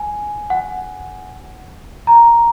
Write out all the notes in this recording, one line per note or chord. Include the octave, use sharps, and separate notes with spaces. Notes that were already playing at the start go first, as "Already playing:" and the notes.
Already playing: G#5
F#5
A#5